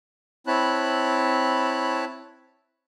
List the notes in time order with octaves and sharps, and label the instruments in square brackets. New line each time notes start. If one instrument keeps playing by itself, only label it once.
[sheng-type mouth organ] C4 E4 C#5 A5 B5 F#6